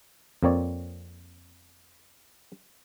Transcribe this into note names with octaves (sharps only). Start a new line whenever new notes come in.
F2 A#3 C4 C#5 D5